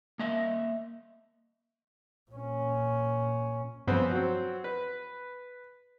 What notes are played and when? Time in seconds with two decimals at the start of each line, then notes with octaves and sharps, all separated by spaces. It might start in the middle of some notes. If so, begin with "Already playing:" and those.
0.19 A#3 D#5 E5
2.32 A#2 C#4
3.87 G2 C#3 F3 B3 C4
4.11 F#3 C4
4.64 B4